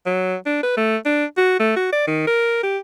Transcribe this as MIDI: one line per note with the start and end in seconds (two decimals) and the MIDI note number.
0.06 0.36 54
0.46 0.59 62
0.63 0.75 71
0.77 0.97 57
1.06 1.25 62
1.37 1.56 66
1.60 1.72 57
1.76 1.90 66
1.93 2.04 74
2.07 2.25 51
2.27 2.62 70
2.63 2.78 67